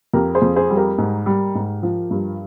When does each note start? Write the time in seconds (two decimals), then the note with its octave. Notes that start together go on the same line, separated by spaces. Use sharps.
0.14 F2 G4 A#4
0.35 G#4 C5
0.42 F2
0.56 G#4 C5
0.70 G3
0.77 G4 A#4
0.98 G#2
1.26 G3
1.55 G#2
1.83 F3
2.11 G2